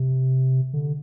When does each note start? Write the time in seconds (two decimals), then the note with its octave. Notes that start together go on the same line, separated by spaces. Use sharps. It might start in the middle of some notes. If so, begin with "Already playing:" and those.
Already playing: C3
0.74 D3